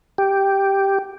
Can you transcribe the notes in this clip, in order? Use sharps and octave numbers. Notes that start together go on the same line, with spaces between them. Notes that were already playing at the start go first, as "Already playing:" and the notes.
G4